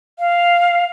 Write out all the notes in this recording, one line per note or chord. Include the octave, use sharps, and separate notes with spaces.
F5